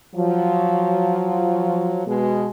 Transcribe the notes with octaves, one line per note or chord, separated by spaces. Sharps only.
F3 F#3
B2 G#3